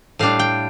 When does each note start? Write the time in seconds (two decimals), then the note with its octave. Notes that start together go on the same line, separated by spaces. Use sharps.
0.19 A2 G3 D4 F5
0.39 G5